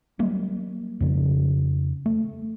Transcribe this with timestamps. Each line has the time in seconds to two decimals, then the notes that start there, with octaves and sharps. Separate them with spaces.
0.19 F#3 G3 A#3
1.00 F2 C#3
2.06 A3